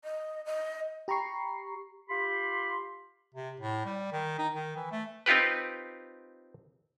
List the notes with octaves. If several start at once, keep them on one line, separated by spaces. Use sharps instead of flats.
D#5
D#5
G4 A#5 B5 C#6 C7
F4 G4 B5 C6
C3
A2
G3
D#3
D#4
D#3
E3
A3
C4 D#4 F4 G4 B4